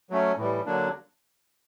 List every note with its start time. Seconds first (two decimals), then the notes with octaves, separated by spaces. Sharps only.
0.10 F#3 A3 C#4
0.37 A2 E3 G3
0.66 D3 F#3 A#3 D4